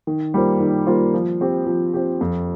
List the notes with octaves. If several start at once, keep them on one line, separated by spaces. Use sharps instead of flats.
D#3
G3 A#3 F4 C5
D#3
G3 A#3 F4 C5
F3
C4 G4
F3
C4 G4
F2